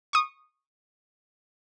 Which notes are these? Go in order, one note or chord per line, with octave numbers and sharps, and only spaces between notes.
C#6 D#6